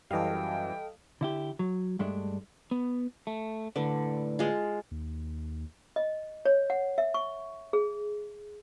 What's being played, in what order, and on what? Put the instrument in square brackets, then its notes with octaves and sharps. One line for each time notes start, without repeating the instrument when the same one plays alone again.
[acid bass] F#2 [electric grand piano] E3 G3 [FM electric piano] A4 D#5 F5 [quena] G5
[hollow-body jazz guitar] D3 E4 G4
F#3
G2 G#3 A3 D4
[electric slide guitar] B3
A3
[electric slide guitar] A2 B4 D5 [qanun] D3
[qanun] G#3 F4
[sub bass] D#2
[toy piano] D#5
C#5
F#5
E5
C#6
G#4